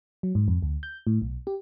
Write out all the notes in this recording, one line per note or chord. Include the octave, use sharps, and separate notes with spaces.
F#3
G#2
F2
D2
G6
A2
B1
G4